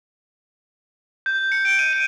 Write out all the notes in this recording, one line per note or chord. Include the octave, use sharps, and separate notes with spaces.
G6
C#7
D7
D#7
D#7